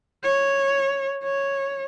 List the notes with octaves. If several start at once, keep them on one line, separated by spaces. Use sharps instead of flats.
C#5
C#5